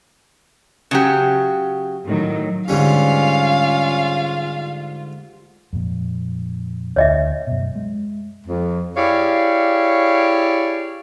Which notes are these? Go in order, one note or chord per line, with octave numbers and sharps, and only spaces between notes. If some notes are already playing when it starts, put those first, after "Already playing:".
C#3 F#3 G4
A2 D#3 F#3
G#2 D3 G3 C#4 F4 F5
F2 A#2
D2 C#5 D#5 E5
F#2 B2
G#3
F2
E4 G4 G#4 C#5 D5 F5